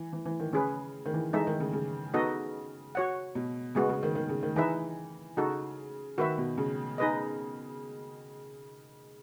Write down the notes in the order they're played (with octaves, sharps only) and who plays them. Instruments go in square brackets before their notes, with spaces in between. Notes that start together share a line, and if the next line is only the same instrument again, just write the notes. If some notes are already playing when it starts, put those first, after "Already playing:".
Already playing: [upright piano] E3
E3
E3
D#3
[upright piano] C#3 [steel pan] C#4 G#4 B4
[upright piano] D#3
E3
[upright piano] E3 [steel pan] G#3 D#4 A4 E5
[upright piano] D#3
C#3
C#3
[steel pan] B3 D#4 F#4 A4 D#5
F#4 C#5 F#5
[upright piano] B2
[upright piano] C#3 [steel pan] G#3 B3 F#4
[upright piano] C#3
D#3
D#3
C#3
D#3
[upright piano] E3 [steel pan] D#4 G#4 B4 E5
[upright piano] C#3 [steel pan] D#4 F#4 A4
[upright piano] D#3 [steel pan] F#4 B4 E5
[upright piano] B2
C#3
[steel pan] D#4 G#4 B4 D#5